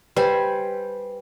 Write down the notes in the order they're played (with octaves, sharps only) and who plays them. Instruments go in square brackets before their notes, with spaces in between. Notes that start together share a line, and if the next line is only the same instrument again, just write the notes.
[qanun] G3 C5 G#5 [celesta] B4